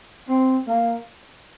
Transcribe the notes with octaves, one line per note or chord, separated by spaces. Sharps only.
C4
A#3